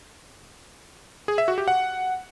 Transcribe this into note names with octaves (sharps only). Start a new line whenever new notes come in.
G#4
E5
F#4
G4
F#5